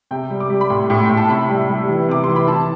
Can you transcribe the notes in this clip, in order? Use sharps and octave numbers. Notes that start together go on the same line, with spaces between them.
C3 G5
G3
D6
G3
B5
A2 C6
A2
A2 G5
A5
C3 B5
G3
G3
E3
C3 D6
E3 C6
B5
E3 A5